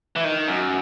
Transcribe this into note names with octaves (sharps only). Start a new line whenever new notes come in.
E3
D#3
F#2